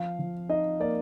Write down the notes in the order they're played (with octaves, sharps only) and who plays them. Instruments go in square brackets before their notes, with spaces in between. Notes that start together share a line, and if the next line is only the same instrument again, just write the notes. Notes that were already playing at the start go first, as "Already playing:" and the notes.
Already playing: [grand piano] F3 F5
F3
D#4 D#5
A#3 D5